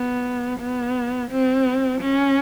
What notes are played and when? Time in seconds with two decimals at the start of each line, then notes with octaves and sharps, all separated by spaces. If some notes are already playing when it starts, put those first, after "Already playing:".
Already playing: B3
0.60 B3
1.31 C4
2.01 C#4